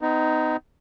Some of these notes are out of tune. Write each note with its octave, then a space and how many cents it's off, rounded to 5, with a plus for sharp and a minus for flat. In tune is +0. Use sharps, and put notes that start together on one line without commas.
B3 +40 D#4 +0